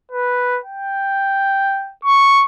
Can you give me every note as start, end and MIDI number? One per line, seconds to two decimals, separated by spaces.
0.12 0.60 71
0.65 1.93 79
2.05 2.45 85